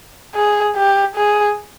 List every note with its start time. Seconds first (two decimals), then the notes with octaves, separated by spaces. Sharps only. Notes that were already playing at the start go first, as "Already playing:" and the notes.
0.35 G#4
0.76 G4
1.16 G#4